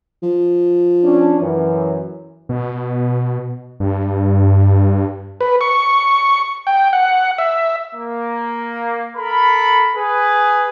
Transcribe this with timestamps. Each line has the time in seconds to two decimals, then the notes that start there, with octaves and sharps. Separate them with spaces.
0.23 F3
1.04 C#4 D4
1.40 F#2 E3
2.49 B2
3.80 G2
5.41 B4
5.61 C#6
6.67 G5
6.93 F#5
7.38 E5
7.95 A#3
9.17 A4 A#4 B5
9.95 G#4 B4